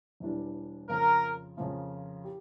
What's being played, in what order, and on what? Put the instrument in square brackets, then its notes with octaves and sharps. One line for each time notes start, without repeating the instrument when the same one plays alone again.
[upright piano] E1 E2 E3 G3 D4
[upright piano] F2 C#3 F3 A#3 [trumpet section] A#4
[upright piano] F2 C#3 F3 A#3
G4